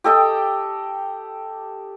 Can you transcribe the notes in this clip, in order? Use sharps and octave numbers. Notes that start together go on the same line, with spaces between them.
G4 A4 D#5 G5